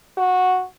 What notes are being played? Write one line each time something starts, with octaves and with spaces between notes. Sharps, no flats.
F#4